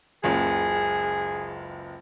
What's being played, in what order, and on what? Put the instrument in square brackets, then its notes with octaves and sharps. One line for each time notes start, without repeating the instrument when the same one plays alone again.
[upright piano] F#1 C#2 [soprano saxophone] G#4